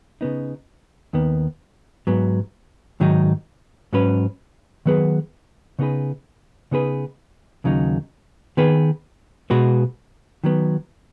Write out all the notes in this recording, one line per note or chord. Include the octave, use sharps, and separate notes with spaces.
C#3 B3 D#4
D#2 D#3 B3
G#2 F#3 B3
G#2 D#3 F#3 D#4
G#2 F#3 C#4 B4
D#3 F#3 B3 G#4 B4
C#3 B3 D#4 G#4 B4
C#3 B3 D#4 G#4 B4
D#2 C#3 F#3 D#4
D#3 B3 G#4 B4
B2 G#3 B3 F#4 B4
D#3 F#3 B3